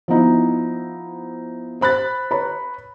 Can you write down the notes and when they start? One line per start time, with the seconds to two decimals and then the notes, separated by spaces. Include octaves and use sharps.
0.08 F3 B3 D#4 E4
1.81 C5 B5 F#6 A6
2.31 B4 C#5 A#5 B5